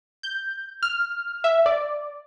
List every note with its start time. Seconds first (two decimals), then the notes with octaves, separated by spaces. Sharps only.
0.23 G6
0.83 F6
1.44 E5
1.66 D5